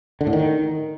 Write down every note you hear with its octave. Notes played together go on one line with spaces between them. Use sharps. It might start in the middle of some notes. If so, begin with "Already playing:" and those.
D3
A2
D#3